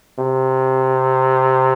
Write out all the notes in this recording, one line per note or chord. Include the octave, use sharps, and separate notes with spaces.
C3